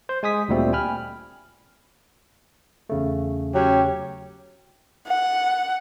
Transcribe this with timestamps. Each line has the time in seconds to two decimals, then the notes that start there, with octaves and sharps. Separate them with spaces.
0.09 C5
0.23 G#3 G#5 D#6 B6
0.49 D2 A#2 D3 G3 A3 C4
0.73 G5 G#5 B5 F6
2.89 E2 C#3 A3
3.54 F#3 C#4 G4
5.07 F#5